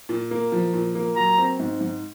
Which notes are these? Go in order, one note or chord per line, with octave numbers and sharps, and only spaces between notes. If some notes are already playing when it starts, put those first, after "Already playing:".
A#2
A#3
F3
A#2
A#3
F#3 A#5
C4
G#2
G#2